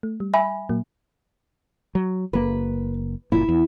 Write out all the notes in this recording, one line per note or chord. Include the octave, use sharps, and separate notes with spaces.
A3
G3
E5 G#5 B5
A#2 F#3 A#3
F#3
F#1 A#3 B4
F#1 A#2 E4
E2